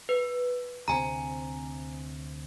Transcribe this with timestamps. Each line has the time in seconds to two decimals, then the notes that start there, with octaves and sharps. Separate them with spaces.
0.09 B4
0.88 D2 C3 C4 G#5 A#5